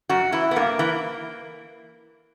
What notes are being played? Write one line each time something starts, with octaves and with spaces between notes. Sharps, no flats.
F#2 F#4
E3 E4
B3
G2 A#3
E3